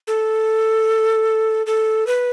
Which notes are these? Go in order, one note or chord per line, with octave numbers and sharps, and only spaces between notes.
A4
A4
B4